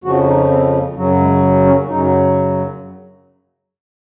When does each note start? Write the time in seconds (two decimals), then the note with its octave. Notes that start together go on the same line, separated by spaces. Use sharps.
0.04 F2 C#3 F3 F#4
0.27 D#4
0.51 C4
0.96 F#2 C#3 F#3
1.20 G#3
1.66 C#4
1.89 F#2 C#3 F#3 D#4